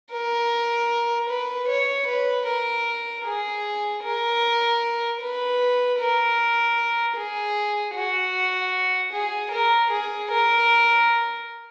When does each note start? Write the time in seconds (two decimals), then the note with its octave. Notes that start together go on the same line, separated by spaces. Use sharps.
0.12 A#4
1.30 B4
1.69 C#5
2.07 B4
2.47 A#4
3.25 G#4
4.04 A#4
5.21 B4
5.99 A#4
7.17 G#4
7.95 F#4
9.13 G#4
9.52 A#4
9.91 G#4
10.31 A#4